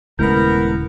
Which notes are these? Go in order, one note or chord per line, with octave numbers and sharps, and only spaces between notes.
D#1 C#3 G#3 A3 B3 E4 A#4 G6